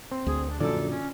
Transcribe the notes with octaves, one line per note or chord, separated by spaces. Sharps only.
C4
D2 G#4
D4
A#1 F#2 D3 A4 D5
C#4